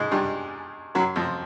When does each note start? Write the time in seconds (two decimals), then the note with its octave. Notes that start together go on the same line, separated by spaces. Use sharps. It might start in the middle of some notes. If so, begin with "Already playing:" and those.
Already playing: G#2 G#3
0.11 G2 G3
0.95 F#2 F#3
1.16 F2 F3